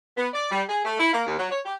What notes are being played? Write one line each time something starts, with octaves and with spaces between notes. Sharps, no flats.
B3
D5
G3
G#4
A3
E4
A#3
D#2
F#3
C#5
G4